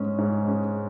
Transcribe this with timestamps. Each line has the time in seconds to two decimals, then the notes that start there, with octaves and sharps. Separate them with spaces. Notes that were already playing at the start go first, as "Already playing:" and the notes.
Already playing: G#2 G#3 C#4
0.18 G#2
0.47 G#3 C#4